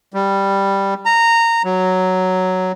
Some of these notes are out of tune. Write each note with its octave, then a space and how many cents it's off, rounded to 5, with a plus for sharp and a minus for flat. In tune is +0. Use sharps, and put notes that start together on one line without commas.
G3 +5
A#5 -15
F#3 +5